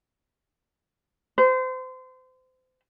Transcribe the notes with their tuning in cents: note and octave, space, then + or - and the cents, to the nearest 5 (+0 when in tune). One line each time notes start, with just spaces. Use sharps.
C5 -30